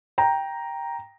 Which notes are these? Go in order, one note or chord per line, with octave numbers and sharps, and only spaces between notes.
G5 A#5